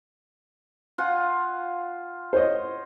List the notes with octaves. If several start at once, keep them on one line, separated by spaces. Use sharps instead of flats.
F4 F#5 G#5
C5 C#5 D#5